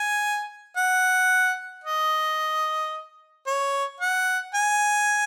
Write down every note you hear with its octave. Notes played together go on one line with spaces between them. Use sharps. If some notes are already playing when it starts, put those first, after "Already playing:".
Already playing: G#5
F#5
D#5
C#5
F#5
G#5